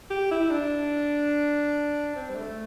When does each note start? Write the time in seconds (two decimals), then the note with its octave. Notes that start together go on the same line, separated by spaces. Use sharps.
0.10 G4
0.31 E4
0.51 D4
2.15 C4
2.29 G3
2.35 A3